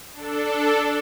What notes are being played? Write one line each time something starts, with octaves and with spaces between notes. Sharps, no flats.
D4 A4